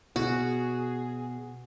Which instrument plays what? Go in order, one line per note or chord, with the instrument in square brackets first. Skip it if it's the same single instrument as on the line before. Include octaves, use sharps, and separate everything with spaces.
[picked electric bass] B2 [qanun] F#4 [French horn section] G#4